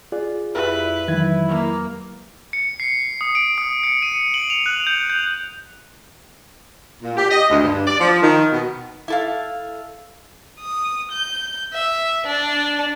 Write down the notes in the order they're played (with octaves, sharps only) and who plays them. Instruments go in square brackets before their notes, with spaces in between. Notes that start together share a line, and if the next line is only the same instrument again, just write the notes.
[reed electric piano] F4 G#4 D5 [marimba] F#6
[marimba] F2 G4 F5 [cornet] E4 [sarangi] B4
[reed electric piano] D#3 E3 G#6 [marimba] F#3 G#3 [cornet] E4
[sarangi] A#3
[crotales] C#7
C7
D#6
D7
D#6
C#7
D#7
F#7
F7
F#6
G6
G6
[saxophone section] A#2
G4
D#5
D2
G2
D5
F3
D#3
B2
[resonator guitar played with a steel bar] E4 A4 F5
[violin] D#6
G6
E5
D4